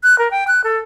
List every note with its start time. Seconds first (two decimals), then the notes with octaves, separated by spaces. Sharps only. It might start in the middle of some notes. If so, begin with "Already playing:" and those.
0.03 F#6
0.19 A#4
0.31 G5
0.48 F#6
0.64 A4